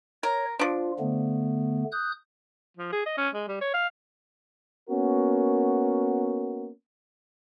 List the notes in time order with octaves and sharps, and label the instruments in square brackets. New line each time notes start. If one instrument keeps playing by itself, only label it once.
[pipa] A#4 [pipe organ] C#5
[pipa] F3 D4 [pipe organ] F4
[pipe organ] D3 A3 B3
D#6 F#6 G6
[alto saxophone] F3
G#4
D#5
C#4
G#3
G3
C#5
F5
[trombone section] A#3 B3 C#4 F#4 A#4